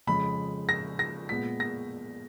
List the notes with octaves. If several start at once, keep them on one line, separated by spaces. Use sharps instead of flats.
F2 C#3 G#3 B5
A#6
A#6
A#2 G#3 B3 B6
A#6